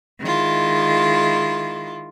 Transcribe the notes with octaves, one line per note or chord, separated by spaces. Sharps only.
D#3 G#3 E4 F4